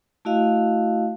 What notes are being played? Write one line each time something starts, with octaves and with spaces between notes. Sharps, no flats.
A3 E4 F#4 D#5 F5